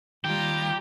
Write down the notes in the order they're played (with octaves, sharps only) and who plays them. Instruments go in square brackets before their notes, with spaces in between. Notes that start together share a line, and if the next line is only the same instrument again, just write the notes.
[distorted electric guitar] D#2 D#3 [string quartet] G3 F4 A#5 [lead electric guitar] G4